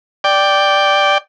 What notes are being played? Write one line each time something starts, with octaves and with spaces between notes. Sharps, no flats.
D5 G5